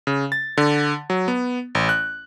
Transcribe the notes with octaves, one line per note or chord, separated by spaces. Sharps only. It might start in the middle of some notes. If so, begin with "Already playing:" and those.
C#3
A6
D3
F#3
B3
A1
F#6